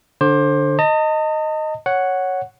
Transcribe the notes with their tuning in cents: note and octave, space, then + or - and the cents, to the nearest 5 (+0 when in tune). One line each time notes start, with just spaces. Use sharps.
D3 +0 C5 +25 D6 +0
D#5 +0 A5 +45
C#5 +0 F#5 +0